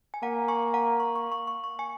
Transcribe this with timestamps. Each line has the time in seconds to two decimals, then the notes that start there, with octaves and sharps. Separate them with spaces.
0.14 G#5
0.23 A#3 F#5 A#5
0.48 G#5 C#6
0.74 F#5 A#5
1.00 C#6
1.16 C#6
1.32 C#6
1.47 C#6
1.64 C#6
1.79 G#5 C#6